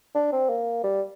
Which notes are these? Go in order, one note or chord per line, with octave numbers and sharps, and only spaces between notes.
D4
C4
A#3
G3